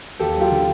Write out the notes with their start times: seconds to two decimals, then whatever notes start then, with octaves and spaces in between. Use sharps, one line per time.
0.20 D#2 G4 A4
0.36 F#3 F4 G4
0.52 D3